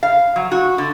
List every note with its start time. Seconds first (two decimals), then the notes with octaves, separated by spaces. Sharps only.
0.03 F5
0.36 F#3
0.51 F#4
0.78 D3